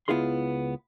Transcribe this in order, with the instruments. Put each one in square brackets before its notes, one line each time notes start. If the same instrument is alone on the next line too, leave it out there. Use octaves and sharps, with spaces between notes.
[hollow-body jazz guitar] C#2 B3 E4 F4 G#4 C6